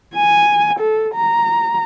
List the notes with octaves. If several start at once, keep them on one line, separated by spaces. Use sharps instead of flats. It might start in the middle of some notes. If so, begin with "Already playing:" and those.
G#5
A4
A#5